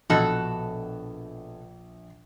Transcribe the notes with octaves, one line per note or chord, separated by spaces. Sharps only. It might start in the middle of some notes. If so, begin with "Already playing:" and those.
A#1 B2 F#4 A4